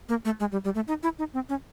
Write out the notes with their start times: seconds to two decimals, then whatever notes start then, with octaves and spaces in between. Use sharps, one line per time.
0.09 A#3
0.25 A3
0.40 G#3
0.52 G3
0.64 G3
0.75 A3
0.88 D#4
1.03 E4
1.19 D#4
1.34 C4
1.49 C#4